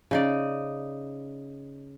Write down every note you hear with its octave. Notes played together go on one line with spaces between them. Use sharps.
C#3 D#4 D5